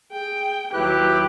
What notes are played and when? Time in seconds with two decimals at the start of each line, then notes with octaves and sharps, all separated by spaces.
0.12 G#4 G5
0.74 D#2 F#3 E4 G4 B4 F#6